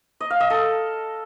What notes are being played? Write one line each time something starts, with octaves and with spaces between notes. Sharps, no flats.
D#5
F5
D#5
A4